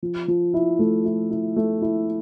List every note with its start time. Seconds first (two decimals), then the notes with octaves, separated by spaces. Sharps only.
0.03 F3
0.28 F3
0.54 E4
0.79 A3
1.05 E4
1.31 E4
1.56 A3
1.82 E4